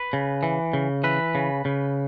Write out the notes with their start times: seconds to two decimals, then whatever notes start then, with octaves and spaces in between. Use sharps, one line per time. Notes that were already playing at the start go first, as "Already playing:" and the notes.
Already playing: B4
0.13 C#3
0.43 E3
0.73 C#3
1.04 E3 B4
1.35 C#3
1.65 C#3